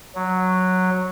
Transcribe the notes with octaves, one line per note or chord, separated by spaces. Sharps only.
F#3